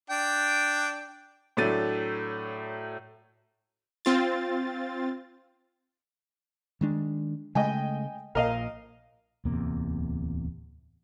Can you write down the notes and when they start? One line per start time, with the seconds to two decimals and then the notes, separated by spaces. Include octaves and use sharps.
0.10 D4 G5
1.57 A2 F#3 A3 D4 A6 D#7
4.05 C4 F4 A6
6.81 D#3 G#3 D4
7.55 C#3 G#3 A3 D#5 G5 G#5
8.35 A#1 A#2 A#4 D#5 F5
9.45 D1 E2 C3 A#3